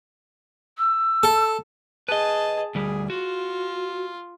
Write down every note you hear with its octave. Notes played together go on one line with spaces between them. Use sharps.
E6
A4
G#4 B4 D#5 A5
D2 G3 G#4
F4 F#4